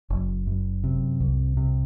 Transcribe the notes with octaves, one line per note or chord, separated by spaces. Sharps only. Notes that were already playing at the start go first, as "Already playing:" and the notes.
F#1
F#2
C3
C2
C3